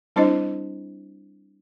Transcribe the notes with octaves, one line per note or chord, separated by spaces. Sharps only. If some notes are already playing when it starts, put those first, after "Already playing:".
G3 C4 D4 E4 C5 D#5